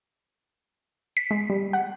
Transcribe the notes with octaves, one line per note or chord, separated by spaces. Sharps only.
B6
G#3
G3
F#5